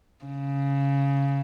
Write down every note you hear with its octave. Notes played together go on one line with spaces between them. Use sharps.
C#3